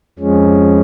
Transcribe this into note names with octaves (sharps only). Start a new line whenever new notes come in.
F2 F3 G#3 C#4